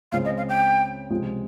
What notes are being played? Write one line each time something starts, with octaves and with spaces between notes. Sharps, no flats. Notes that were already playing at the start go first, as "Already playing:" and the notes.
C#2 C#3 G#3 C4 F5
D#5
F5
G5
C#2 C3 F3 G#3